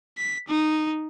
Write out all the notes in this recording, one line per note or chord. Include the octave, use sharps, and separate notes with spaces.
B6
D#4